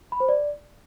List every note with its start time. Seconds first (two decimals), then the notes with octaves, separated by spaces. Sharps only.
0.12 B5
0.20 C5
0.29 D5